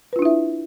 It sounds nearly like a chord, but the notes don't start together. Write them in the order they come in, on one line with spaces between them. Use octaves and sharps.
B4 F4 D4 E4 E5